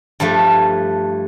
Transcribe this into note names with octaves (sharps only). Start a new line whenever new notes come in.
G2 F3 A3